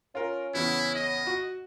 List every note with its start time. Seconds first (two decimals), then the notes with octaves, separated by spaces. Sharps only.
0.15 C#4 F4 A#4
0.54 E2 C#3 B3 E4
0.95 D#5
1.27 F#4 C#6